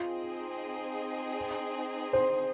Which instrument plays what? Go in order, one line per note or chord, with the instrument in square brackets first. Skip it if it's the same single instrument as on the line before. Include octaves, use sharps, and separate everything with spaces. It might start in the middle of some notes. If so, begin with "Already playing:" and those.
Already playing: [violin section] C4 D#4 G#4 D#5 [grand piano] F4
[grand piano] C5